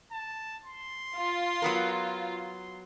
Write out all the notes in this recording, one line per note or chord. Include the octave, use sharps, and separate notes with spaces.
A5
C6
F4
F#3 B3 A#4
C6